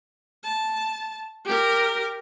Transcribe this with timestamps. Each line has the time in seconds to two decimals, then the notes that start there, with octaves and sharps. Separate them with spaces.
0.44 A5
1.45 G4 A#4